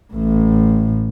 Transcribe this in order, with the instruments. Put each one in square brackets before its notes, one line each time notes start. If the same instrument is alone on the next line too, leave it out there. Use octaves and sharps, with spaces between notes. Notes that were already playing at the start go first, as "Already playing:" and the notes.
[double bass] A1 A2